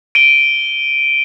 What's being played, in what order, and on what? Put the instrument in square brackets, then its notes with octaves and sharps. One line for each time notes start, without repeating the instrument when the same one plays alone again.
[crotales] D7 D#7 G7